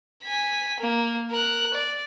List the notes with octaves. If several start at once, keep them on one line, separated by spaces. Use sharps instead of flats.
G#5 B6
A#3
A#4 F#6
D5